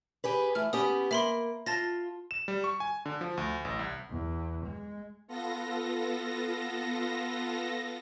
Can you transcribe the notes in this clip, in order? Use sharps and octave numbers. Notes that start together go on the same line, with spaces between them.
G4 G#4 B4
E3 A3 F6
B3 C#4 G4 D#6
A#3 E5 B5 C6
F4 A5 A6 A#6
E7
G3
C#6
G#5
D3
F3
D2
A1
C2
E2
G#3
B3 F4 A4 A#6